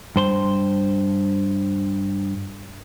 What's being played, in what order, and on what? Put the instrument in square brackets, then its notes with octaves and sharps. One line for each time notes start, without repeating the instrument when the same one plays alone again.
[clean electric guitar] G2 C5 C6